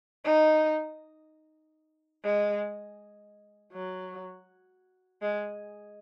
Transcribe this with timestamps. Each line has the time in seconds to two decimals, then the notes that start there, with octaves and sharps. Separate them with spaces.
0.25 D#4
2.24 G#3
3.73 F#3
5.22 G#3